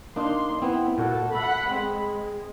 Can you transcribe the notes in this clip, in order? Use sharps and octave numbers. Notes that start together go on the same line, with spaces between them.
A#3 D4 D#4 C6
B3 C4 E4
A#2 F#4 A4 F#5
A4 E5 F#5 B5
G#3 C4